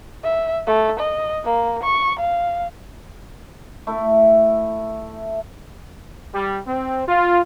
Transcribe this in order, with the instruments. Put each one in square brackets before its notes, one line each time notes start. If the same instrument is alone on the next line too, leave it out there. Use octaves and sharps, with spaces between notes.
[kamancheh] E5
A3
D#5
A#3
C#6
F5
[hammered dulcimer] A3 E4
[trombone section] G3
C4
F4